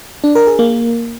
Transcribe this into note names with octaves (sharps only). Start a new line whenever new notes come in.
D4
A#4
G#4
A#3